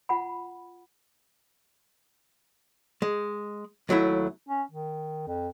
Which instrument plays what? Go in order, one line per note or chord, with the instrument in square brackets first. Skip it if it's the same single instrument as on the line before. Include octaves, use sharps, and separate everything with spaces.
[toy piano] F4 F#5 B5
[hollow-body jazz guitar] G#3
D#2 F#3 A3 E4
[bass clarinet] C#4
D#3
F2